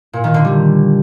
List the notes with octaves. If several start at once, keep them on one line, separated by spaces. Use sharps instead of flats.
A#2
D#3
D3
G3